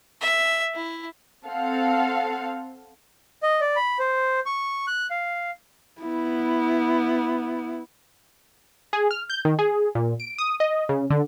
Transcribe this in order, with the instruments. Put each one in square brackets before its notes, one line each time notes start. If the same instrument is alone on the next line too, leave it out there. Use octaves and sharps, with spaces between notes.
[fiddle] E5
E4
[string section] C4 A4 F5 F#5
[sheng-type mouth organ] D#5
D5
B5
C5
C#6
F#6
F5
[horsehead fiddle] B3 E4
[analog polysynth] G#4
F6
G6
D#3
G#4
A#2
D7
D#6
D#5
C#3
D3